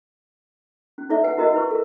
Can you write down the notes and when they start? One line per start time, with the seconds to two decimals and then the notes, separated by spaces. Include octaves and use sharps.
0.98 C#4
1.09 D#4 E4 A4 D5 E5
1.23 B4 F#5 G#5
1.37 E4 F#4 A#4 D#5 F#5
1.54 E4 B4 C#6
1.71 A4 A#4